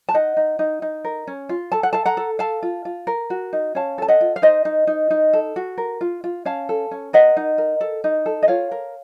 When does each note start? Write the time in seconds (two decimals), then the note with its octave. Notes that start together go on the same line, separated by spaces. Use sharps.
0.09 A5
0.14 D#4 D#5 F#5
0.37 D#4
0.59 D#4
0.82 D#4
1.04 A#4
1.27 C#4
1.49 F4
1.72 A4 A5
1.83 F#5
1.93 A4 F5 A5
2.05 F#5 A#5
2.17 A4
2.39 A4 F5 A5
2.63 F4
2.85 F4
3.07 A#4
3.30 F#4
3.53 D#4
3.75 C#4 F5 A5
3.98 A4 A5
4.08 D#5 F#5
4.21 F4
4.36 F5
4.42 D#4 C5 D#5
4.65 D#4
4.87 D#4
5.11 D#4
5.33 A4
5.56 F#4
5.78 A#4
6.01 F4
6.24 F4
6.45 C#4 F5 A5
6.69 A4
6.91 C#4
7.13 A#4 D#5 F#5
7.37 D#4
7.58 A#4
7.81 A4
8.04 D#4
8.26 A4
8.43 D#5
8.48 F4 C#5 F5
8.71 A#4